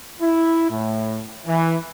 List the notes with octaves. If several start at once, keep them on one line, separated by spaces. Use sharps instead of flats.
E4
A2
E3